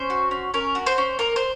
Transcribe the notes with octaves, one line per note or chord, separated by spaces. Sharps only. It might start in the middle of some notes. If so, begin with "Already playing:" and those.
Already playing: C#4 C5
F#4
C#4
C#4 A#4
F#4
C5
C#4
A#3 A#4
C5